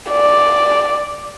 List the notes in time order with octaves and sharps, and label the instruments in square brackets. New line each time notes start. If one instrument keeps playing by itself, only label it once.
[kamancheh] D5